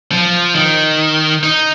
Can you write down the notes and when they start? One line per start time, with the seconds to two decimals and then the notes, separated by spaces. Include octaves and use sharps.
0.12 F3
0.55 D#3
1.43 D#4